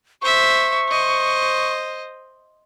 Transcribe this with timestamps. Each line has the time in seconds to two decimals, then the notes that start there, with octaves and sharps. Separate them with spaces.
0.22 C5 E5 C#6
0.88 C5 D#5